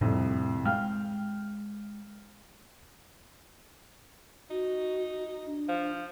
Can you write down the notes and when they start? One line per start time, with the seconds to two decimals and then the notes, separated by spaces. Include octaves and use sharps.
0.01 C2 F2 A2 G3
0.65 G#3 F5 G5 F6
4.50 D#4 F#4
5.46 D4
5.69 F3